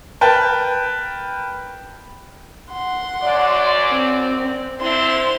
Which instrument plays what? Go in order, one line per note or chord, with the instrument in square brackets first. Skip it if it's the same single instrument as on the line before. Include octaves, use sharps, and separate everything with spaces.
[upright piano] A#4 B4 G5 A5
[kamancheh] F#5 C6
[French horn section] F#2 D5
[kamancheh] C4
[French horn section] D3 C4 E4 [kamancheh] C5 C6